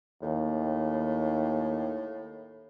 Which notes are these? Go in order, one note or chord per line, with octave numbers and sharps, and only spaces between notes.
D#2 A2